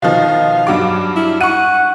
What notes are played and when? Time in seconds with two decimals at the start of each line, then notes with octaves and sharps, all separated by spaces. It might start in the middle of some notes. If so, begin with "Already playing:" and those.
0.02 B2 D#3 F3 F5
0.67 G2 F#3 D6
1.16 E4
1.41 F#5 C#6 D#7